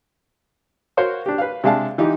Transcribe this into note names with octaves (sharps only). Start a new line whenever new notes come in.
F#4 A#4 C5 C#5 F5 C#6
D4 G4
B4 F5
C3 G#3 D4 F5 A5
E3 D#4 F4 G4